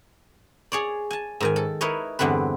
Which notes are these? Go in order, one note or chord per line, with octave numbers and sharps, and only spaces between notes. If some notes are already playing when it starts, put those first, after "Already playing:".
G#4 C#5 D5
G#5 A5
G#2 D#3 G#5
A4
D#4 E4 A#4 B4 C#5 D#5
E2 G2 D3 C4 B4